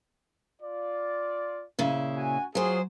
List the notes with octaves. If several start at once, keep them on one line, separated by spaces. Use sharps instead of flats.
F4 D5
A#2 C#3 E4
F#4 G#5
F#3 F4 F#4 G#4 C5